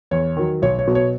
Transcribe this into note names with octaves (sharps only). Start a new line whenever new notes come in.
E2 C#5
D#3 F#3
B1 C#5
C#5
B2 F#3
C#5